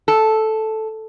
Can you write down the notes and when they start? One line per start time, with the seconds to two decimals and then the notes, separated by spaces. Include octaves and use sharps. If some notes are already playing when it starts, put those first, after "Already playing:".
0.08 A4